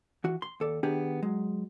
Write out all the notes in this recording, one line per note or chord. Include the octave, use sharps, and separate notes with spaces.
E3 F#4
C6
D#2 A4 D5
D#3 B3 D4 G4 G#4
F#3 G#3